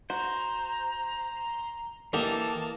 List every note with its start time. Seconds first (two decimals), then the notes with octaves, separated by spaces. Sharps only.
0.10 F#4 C5 A#5
2.13 E3 A#3 G4 A4 D#5 A5 A#5